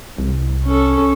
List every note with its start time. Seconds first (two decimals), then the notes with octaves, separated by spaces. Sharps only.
0.18 C2
0.65 C#4 A4